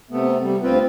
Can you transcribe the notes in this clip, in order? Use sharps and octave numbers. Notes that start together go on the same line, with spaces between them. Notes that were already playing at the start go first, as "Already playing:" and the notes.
C3 A3 B3
G3
D2 C4 F4 B4